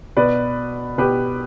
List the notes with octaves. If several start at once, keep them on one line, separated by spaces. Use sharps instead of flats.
B2 B4 D5
B2 G4 B4